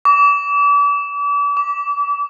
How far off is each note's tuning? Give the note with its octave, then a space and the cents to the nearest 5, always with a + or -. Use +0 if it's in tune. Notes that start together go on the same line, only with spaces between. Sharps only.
D6 -40
D6 -25